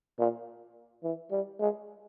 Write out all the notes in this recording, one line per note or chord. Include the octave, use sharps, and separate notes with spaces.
A#2
E3
G3
G#3